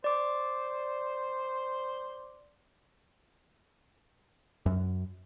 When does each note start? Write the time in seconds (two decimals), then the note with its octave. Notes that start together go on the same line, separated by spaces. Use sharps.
0.04 C5 D5 D6
4.66 F#2